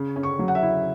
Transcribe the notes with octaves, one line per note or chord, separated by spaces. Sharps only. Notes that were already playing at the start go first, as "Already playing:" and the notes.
Already playing: C#3
C#4
C#6
F#3
F#5
E5
E4